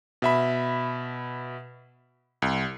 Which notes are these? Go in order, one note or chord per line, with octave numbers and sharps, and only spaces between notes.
B2 E5 B5
C2